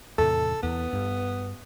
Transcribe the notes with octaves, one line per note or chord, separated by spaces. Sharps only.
E2 A2 C3 A4
E2 B3
G2